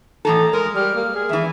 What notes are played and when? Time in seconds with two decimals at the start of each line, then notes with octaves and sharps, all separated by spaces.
0.25 A2 E3 A4 A#5
0.53 G#3 A#4
0.75 G3 F6
0.95 A#3
1.15 G#4
1.29 E2 E3 E5